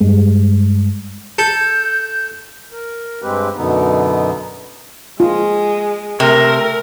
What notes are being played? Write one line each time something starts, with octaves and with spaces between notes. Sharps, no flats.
G2 G3 G#3
A4 G6
A#4
G2 G#3 C4 G4 B4
F#2 B2 D3 B3 D#4
G#3 F4
C3 A3 A#4